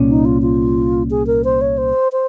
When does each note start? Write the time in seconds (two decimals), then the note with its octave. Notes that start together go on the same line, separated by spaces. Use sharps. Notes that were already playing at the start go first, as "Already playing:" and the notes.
Already playing: C2 A#2 C#4
0.09 D#4
0.25 F4
0.42 F4
1.10 G#4
1.27 A#4
1.44 C5
1.61 C#5
1.78 C5
2.12 C5